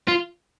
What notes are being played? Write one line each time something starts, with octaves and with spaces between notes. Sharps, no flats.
F4